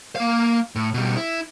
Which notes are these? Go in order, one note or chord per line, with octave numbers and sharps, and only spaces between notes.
A#3 F5
A2
B2 G3
E4